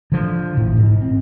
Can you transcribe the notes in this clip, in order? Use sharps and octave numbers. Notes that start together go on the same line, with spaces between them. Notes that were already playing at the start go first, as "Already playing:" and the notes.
D3 F3
A1 A2
G#2
C4